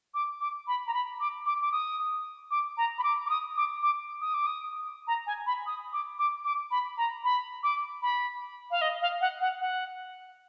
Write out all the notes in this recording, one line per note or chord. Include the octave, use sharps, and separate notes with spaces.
D6
D6
B5
A#5
B5
D6
D6
D6
D#6
D6
A#5
B5
D6
D6
D#6
D6
D6
D#6
D6
D#6
A#5
G#5
B5
D#6
D6
D6
D6
B5
A#5
B5
D6
B5
F5
D#5
F5
F#5
F#5
F#5